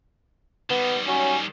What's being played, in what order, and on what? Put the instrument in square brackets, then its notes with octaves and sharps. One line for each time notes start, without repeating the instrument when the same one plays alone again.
[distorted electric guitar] D#3 G3 [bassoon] B3
[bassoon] F#3 [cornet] C#4